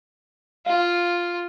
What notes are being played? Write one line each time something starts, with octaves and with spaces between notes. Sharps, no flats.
F4 F5